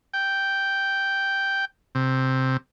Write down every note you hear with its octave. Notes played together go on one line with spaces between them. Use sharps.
G5
C3